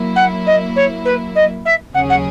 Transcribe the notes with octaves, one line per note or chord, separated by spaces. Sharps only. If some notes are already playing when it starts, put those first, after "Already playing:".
Already playing: F#3 A#3 E4
F#5
D#5
C#5
B4
D#5
E5
D#2 C#3 F#3 C#4 G#4 F#5
F#5